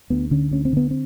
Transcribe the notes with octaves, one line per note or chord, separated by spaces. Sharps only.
D2 B3
D3 C#4
D2 C#4
C4
D3 B3
C4